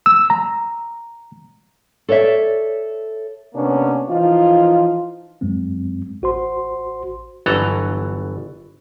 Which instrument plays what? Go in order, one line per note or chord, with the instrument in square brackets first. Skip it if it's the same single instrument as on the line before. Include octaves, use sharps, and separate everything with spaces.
[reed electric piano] E6
A#5
[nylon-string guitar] A4 C#5 D5 E5
[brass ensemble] C3 A#3 B3 C#4 D4
E3 F3 D#4 F4
[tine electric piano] F#2 F#3 G#3 C4
A1 F#4 C5 C6
[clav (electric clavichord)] G1 E3 F#3 A4 A#5